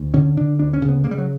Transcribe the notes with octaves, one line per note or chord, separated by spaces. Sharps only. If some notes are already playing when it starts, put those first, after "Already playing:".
Already playing: D2
D3 C#4
D3 D4
D2 D4
C#4
C#3
B3
C#3 A#3
G3
F#3